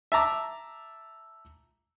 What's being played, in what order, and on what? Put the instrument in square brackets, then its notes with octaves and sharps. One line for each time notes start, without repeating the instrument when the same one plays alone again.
[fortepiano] E5 A5 A#5 D6